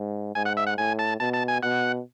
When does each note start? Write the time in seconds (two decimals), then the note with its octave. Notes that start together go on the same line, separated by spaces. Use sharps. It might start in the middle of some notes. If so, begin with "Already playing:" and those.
Already playing: G#2
0.35 G#2 G#5
0.45 F#5
0.57 E5
0.67 F#5
0.77 A2 G#5
0.99 A5
1.20 B2 A5
1.33 A5
1.48 G#5
1.63 B2 F#5